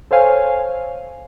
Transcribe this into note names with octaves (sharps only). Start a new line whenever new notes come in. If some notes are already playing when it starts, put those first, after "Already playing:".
A4 C5 C#5 F5 G#5